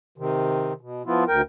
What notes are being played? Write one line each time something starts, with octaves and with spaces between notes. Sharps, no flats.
C3 D#3
B2
F3 B3 E4 F4
D2 A#4 G5